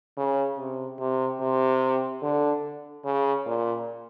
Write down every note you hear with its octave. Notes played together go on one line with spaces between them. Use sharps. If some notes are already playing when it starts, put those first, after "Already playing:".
C#3
C3
C3
C3
D3
C#3
A#2